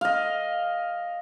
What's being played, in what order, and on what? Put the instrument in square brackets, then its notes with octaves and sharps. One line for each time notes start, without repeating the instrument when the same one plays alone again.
[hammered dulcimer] D#5 F5